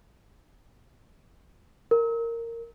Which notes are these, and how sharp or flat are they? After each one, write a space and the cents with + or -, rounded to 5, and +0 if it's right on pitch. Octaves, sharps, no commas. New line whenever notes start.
A#4 -15